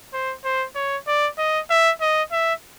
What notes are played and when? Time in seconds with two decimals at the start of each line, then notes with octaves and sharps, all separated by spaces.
0.13 C5
0.44 C5
0.75 C#5
1.07 D5
1.38 D#5
1.70 E5
2.01 D#5
2.32 E5